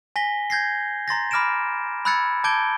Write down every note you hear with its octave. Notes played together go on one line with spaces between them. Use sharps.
G#5 A#6 B6 G7
G6 G#6 A#6 C7
A#5 C6 A6 A#6
B5 D6 F6 A#6 D7 E7
B5 E6 F#6 G#6 A6 C#7
A5 D6 G6 G#6 D7 G7